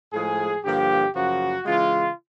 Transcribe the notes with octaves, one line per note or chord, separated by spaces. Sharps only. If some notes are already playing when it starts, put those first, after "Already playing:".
A2 F3 G#3 G#4
G2 D3 F3 A#3 G4
F#2 C#3 F3 A#3 F#4
C#3 E3 G#3 F4